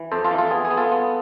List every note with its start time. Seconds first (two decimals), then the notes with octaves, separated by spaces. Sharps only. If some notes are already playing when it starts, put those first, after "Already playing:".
Already playing: E3
0.12 F2 A4 C5
0.25 F4 A4
0.31 E3
0.38 F4 A4
0.51 B3 G#4
0.65 G#4
0.71 B3
0.77 F4 A4
0.92 B3